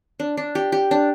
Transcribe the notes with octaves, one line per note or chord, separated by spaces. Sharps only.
D4
D4
G4
G4
D4